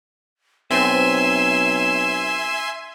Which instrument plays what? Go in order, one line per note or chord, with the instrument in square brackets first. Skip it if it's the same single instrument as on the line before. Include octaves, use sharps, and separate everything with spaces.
[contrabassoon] B1 [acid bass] C4 [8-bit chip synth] E5 G#5 C6 [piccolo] E7